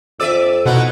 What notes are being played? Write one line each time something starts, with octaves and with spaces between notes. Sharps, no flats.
F2 D5 E5 E6 D#7
B2 A3 D#4 E4 F#5